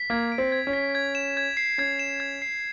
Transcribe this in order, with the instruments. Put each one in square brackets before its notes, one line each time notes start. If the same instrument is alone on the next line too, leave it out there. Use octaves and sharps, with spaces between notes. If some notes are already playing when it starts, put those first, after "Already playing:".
Already playing: [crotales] B6
[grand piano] A#3 [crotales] G#6
[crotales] D7
[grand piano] C4
[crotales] G#6
[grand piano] C#4
[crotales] B6
G#6
E7
G#6
C7
[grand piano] C#4 [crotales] G#6
[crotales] E7
G#6
C7